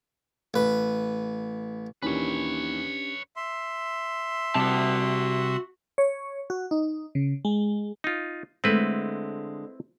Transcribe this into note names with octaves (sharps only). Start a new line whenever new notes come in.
A1 B4
D#2 D#3 E3 C#4 D4 G4 B4 C#5
E5 C6
C3 G3 F#4 A5
C#5
F#4
D#4
C#3
G#3
D#4 F4
D3 G#3 A3 C4 E4 B4